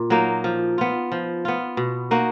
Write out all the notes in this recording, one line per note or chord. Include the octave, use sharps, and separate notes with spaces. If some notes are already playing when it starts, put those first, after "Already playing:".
Already playing: A#2
F#3 A#3 D#4
F3
B3 F4
F3
B3 F4
B2
A#3 D#4 F#4